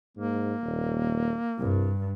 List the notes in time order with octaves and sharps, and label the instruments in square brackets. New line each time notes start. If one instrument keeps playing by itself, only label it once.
[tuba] G#2 [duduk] A#3
[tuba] D#1
[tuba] C2 [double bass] G2